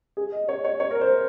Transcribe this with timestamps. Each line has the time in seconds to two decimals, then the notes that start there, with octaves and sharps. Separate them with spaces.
0.17 G#4
0.32 D#5
0.49 C#5
0.65 C#5
0.80 C#5
0.91 A#4
1.01 C5